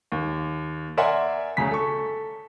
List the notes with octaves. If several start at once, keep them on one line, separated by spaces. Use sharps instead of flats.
D#2
A#4 D5 E5 F#5 G#5 C6
D2 C#3 C#4 A#5 B6
A4 C#6